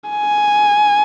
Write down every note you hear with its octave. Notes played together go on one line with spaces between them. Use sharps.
G#5